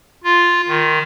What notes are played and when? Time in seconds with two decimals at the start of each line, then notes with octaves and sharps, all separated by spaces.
0.24 F4
0.68 D#3